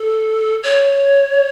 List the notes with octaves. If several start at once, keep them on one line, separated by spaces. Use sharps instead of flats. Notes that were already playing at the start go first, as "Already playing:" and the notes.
Already playing: A4
C#5